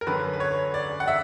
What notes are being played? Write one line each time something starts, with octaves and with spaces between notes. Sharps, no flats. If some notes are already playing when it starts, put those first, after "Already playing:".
A#4
F#2 D3 F#3 B4
B4
C#5
D5
F#5
E5